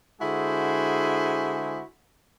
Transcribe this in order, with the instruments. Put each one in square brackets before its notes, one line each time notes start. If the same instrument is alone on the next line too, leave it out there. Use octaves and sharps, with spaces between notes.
[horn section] D3 G#3 E4 F#4 G#4 C5